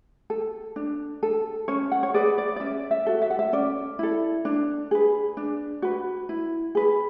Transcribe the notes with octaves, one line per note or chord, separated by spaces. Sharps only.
A4
D4
A4
C#4 C#5
F#5
C#5
G#4 B4 D5
D5
D5
C#4 E5
E5
F#4 A4
E5
F#5
E5
C#4 D5
E4 A4
D4
G#4 B4
D4
F#4 B4
E4
G#4 B4